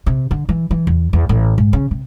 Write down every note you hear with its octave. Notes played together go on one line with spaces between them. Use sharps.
C3
D3
E3
E3
E2
E2
A1
G#2
C#3
C3